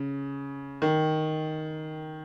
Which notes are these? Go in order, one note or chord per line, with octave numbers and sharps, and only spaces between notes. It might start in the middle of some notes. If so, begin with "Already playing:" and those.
Already playing: C#3
D#3